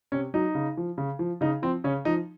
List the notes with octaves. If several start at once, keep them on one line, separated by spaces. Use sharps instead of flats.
C3 C#4
F#3 D#4
C#3
F3
C#3
F3
C#3 D#4
F3 C4
C#3 C#4
F3 D#4